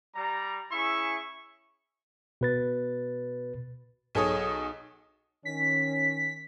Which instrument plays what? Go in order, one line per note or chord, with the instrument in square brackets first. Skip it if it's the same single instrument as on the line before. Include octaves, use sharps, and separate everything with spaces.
[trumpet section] G3 A#5
C#4 E4 G#4 E5 C#6
[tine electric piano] B2 B4 A6
[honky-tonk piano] B1 G#4 A4 C#5 D#6
[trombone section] D#3 C#4 [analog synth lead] B6